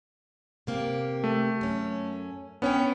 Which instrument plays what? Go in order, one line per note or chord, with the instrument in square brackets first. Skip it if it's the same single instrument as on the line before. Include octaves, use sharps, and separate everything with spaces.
[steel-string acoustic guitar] C3 A#3 G4
[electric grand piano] A3
[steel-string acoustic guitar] F#2 C#4
[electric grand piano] B3 C#4 [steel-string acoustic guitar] D4 C#5 G5